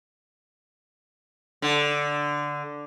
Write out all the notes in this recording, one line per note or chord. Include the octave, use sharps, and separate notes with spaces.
D3